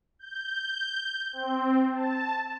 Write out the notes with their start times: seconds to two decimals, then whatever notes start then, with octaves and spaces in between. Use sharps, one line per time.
0.19 G6
1.33 C4
1.93 A5